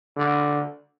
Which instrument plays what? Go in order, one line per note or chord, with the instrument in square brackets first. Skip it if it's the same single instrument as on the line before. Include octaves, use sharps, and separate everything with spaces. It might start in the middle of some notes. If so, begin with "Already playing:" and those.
[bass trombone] D3